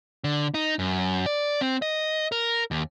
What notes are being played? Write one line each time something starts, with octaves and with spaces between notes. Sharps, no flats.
D3
D#4
F#2
D5
C4
D#5
A#4
D#2